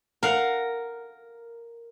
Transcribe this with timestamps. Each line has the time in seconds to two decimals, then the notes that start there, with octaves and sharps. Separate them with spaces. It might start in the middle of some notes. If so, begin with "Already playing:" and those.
0.23 A#4 F5 F#5